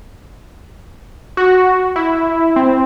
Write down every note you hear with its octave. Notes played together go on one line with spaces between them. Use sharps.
F#4
E4
C4